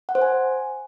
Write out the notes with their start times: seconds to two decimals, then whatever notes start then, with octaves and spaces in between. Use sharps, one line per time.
0.09 F#5
0.15 C5
0.22 G#5